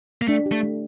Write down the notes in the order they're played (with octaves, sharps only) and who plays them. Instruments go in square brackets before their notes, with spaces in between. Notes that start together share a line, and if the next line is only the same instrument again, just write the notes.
[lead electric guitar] A#3
[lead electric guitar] A3 [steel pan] D4
[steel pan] G4
[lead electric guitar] A3
[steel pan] A3